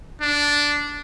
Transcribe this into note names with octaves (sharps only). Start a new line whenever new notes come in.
D4